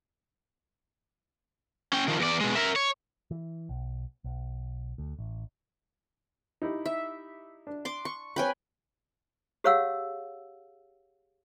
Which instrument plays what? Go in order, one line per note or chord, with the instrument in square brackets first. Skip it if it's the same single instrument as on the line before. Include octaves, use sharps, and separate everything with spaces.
[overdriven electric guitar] C#4 G5
D#3 F3
E2 D5
B2 G#3
A#4 E5
C#5
[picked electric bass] E3
B1
B1
D2
A1
[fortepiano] D#4 E4 G4
[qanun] E5
[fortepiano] D4
[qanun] C6 D6
C#6
[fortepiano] C4 C#5 [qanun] B4 G5 G#5
[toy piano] G4 G#4 C#5 F5 F#5 E6